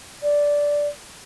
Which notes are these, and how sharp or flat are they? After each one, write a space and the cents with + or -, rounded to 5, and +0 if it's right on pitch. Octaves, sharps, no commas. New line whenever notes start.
D5 -10